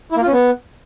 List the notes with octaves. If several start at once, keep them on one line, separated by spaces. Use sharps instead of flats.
E4
A#3
F4
C#4
B3